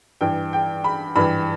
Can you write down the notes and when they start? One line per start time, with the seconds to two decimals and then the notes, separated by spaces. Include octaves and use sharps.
0.21 G2 E3 G5
0.53 G5
0.84 B5
1.16 G2 E3 B5